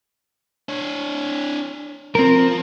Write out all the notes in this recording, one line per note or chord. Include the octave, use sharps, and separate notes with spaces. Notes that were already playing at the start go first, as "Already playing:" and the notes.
D4 C#5
F3 C4 A#4